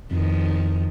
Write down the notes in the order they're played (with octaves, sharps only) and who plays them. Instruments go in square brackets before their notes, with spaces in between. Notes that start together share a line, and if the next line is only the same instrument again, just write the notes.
[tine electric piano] F2 [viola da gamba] D#3 F3